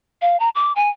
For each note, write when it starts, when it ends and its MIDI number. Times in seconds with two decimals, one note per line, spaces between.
0.22 0.39 77
0.40 0.49 82
0.55 0.72 86
0.76 0.90 80